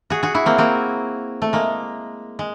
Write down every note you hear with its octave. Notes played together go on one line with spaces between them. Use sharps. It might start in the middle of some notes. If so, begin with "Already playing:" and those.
F#4 G#4
F#4 G#4
E4 F#4
A#3 C4
A#3 C4
A3
G#3 A#3
G#3